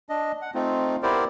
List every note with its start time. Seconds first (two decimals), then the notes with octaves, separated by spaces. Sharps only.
0.09 D4 D#5
0.42 F#5
0.54 A3 C4 D#4 F4
1.03 B3 E4 G4 A#4 C5 D5